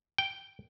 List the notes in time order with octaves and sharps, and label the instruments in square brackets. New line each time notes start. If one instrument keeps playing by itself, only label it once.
[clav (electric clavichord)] G5